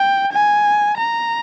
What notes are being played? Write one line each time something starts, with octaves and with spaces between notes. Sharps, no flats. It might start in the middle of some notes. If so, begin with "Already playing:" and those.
Already playing: G5
G#5
A#5